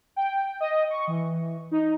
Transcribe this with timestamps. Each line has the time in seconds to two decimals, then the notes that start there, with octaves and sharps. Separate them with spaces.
0.16 G5
0.60 D#5
0.90 C#6
1.07 E3
1.71 D#4